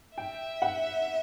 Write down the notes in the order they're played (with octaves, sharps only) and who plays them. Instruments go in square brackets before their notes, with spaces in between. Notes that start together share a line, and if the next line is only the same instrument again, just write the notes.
[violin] E5 [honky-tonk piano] G5
[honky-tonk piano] F#5